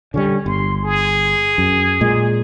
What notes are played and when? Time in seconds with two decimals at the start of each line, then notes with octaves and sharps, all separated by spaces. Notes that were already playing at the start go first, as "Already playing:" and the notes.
0.14 D3 F#3 G3 C#4
0.46 G1 C6
0.83 G#4
1.58 F#2
2.01 A#2 G#3